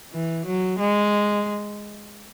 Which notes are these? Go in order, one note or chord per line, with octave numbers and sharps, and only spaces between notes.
E3
F#3
G#3